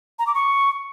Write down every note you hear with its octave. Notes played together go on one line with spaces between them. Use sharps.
A#5
D6
C#6